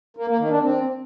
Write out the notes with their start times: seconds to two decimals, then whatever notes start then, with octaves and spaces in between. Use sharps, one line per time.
0.17 A#3
0.28 A#3
0.39 D#3
0.50 D4
0.61 C4